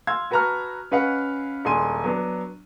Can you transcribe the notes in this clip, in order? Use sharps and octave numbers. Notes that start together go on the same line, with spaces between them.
F5 C6 E6 G#6
F#4 B4 A5 A#5 C#6 F6
C#4 B4 D#5 F5 F#5
D#1 G#3 D4 G#5 C6 D#7
F#3 B3 D4